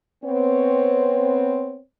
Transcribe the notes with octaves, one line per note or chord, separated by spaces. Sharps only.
B3 C4 C#5